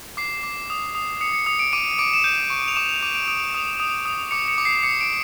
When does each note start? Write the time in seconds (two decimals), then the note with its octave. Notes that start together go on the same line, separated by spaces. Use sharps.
0.17 D6 C7
0.43 D6
0.70 D#6
0.95 D#6
1.21 D#6 C#7
1.34 C#7
1.46 D#6 C#7
1.59 D7
1.73 D6 D#7
1.98 D6 D7
2.14 E7
2.24 G6 D#7
2.50 C#6
2.68 F7
2.76 D6 E7
2.89 F7
3.02 D6 D#7
3.15 D7
3.28 D#6 D7
3.54 D#6
3.80 D#6
4.05 D#6
4.31 D6 C#7
4.48 C#7
4.58 D6
4.65 C7
4.83 D6 C#7
5.01 D7